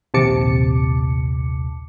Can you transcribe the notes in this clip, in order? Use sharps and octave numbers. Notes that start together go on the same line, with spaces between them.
A#1 D#2 C3 A5 D6 C#7